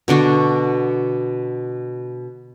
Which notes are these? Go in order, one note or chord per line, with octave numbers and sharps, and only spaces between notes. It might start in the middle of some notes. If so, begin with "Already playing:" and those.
B2 D3 D4 F#4